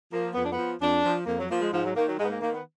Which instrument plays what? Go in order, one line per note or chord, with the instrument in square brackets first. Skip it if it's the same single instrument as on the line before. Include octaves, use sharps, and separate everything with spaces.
[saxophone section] F3 A#3
F2 B3
D4
F3 B3
F2 D4
F3
F2 A#3
F#3
F3 A#3
G#3
G#2 F3
F#3
D#3 A#3
F#3
G#2 G#3
B3
A#3
D#3 A#3
B3